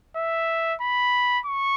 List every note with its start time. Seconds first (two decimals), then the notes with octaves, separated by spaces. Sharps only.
0.16 E5
0.81 B5
1.46 C#6